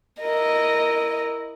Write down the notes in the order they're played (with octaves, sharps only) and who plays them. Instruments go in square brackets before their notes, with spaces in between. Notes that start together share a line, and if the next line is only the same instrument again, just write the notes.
[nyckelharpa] E4 A#4 [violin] D#5